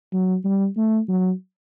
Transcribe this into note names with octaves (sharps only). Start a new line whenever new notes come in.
F#3
G3
A3
F#3